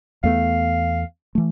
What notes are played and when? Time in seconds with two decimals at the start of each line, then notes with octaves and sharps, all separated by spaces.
0.24 E2 A3 B3 F5
1.35 E3 A3